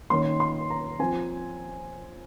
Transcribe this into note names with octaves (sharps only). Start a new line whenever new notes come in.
D#3 A#3 C#4 C6
C6
A#5
F3 C4 G#5